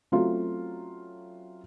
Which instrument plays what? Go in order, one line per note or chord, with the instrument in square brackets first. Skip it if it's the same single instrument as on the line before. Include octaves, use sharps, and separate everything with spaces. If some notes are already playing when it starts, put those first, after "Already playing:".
[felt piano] F#3 A3 C4 C#4 F4 F#4